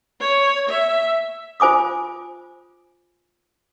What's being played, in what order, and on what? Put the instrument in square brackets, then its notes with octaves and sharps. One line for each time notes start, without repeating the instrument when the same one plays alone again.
[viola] C#5
E5
[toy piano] F4 C5 G#5 D6 D#6